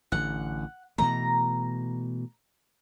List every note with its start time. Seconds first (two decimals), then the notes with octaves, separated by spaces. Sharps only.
0.12 A1 D3 F#5
0.98 B2 E3 A3 A#5